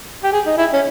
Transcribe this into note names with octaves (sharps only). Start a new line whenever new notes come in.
G4
G#4
D#4
E4
C#4